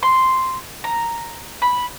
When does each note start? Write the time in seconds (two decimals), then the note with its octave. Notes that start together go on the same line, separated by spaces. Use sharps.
0.03 C6
0.84 A#5
1.62 B5